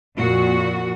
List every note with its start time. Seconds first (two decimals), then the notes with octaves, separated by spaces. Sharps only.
0.18 F2 A#2 F#4